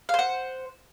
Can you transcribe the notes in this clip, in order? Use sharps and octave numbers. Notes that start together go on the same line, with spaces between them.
C5 F5 F#5